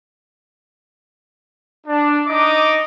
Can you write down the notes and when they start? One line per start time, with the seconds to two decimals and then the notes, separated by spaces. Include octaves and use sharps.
1.87 D4
2.27 D#4 D#5 D6